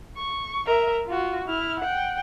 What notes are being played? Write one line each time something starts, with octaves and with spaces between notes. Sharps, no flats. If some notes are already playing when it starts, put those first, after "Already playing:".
C#6
A#4 E5
F4 F#4
E4 F6
F#5 G5